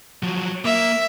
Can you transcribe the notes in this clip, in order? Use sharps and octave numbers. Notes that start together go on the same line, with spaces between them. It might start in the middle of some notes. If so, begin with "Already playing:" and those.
F3 F#3
A#3 E5